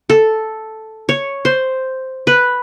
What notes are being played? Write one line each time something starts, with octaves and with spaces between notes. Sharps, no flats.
A4
C#5
C5
B4